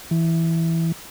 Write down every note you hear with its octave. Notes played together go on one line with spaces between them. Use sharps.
E3